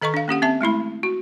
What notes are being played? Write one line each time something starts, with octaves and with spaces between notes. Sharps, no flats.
D#3 A4 D#5 A#5 C#6
D4 F5
A#3 C#4 G4 F#5
C4 E5 A5
G#3 A3 E4 B5
F#4